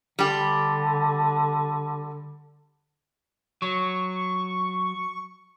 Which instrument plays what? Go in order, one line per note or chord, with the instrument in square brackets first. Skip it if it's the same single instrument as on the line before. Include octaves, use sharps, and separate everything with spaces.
[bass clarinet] D3 [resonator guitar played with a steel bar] G3 G4
[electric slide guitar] F#3 [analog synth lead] C#6